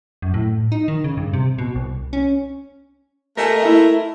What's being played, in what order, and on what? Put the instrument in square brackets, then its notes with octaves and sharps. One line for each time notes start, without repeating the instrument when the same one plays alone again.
[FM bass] F#2
A2
D#4
D#3
C#3
G2
C3
B2
C2
C#4
[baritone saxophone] A3 [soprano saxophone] A#4 [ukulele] D#5 G#5
[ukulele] E4 E5